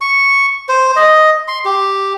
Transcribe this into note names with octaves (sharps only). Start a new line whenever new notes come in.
C#6
C5
D#5
C6
G4